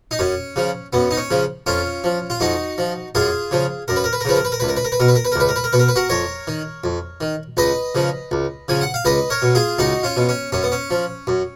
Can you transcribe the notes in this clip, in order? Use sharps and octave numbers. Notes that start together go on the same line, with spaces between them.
D#4
F#2 C#4
C#3 F3
F#2 B3
D#4
C#4
C#3 F3
F2 C#4 F4
F3
F4
F2 D#4 F#4
F3
F#2 F4 G#4
C#3 F3
F#2 A#4
B4
A#4
B4
A#4
C#3 F3 B4
A#4
B4
A#4
C#2 B4
A#4
B4
A#4
B4
B2 A#4
B4
A#4
B4
A#4
C#2 B4
A#4
B4
A#4
B2 B4
A#4
B4
F#4 A#4
F2 A#4 C#5
D#3
F2
D#3
C#2 B4 D#5
C#3 F3
C#2
C#3 F3 G#5
F#5
F5
C#2 B4 D#5
A#4 C#5
B2
F4 G#4
C#2 D#4 F#4
C#4 F4
B2
C#4
F#2 C#4
B3
C#4
F3
F#2